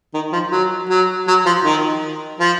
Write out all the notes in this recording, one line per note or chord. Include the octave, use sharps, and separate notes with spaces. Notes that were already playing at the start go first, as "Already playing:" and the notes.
D#3
F3
F#3
F#3
F#3
F3
D#3
F3